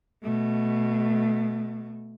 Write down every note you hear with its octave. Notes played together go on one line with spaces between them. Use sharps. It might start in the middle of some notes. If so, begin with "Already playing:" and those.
B2 A3